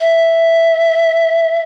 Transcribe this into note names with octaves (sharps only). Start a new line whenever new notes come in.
E5